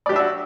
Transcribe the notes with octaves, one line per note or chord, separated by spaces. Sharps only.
D4 F#4 G4 D5 E5